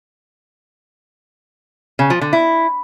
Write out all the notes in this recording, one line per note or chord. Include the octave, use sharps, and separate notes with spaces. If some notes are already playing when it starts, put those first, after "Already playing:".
C#3
F3
D3
E4